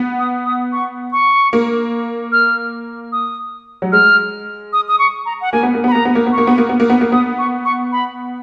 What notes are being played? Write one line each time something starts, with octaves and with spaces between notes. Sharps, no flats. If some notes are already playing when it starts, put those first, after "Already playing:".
Already playing: B3
D#6
D#6
C#6
C#6
A#3
F6
D#6
F#3
G#3 F6
D#6
D#6
C#6
A#5
F#5
A#3 G#5
B3
A#3
B3 B5
A#3 A#5
B3
A#3
B3
C#6
A#3
B3
A#3
B3
A#3
B3
A#3
B3 D#6
C#6
C#6
B5